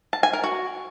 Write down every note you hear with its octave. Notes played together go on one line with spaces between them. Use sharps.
A5
G#5
A#4
F#4